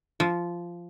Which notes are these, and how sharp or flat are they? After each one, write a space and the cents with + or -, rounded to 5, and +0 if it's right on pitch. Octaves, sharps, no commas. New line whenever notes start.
F3 -10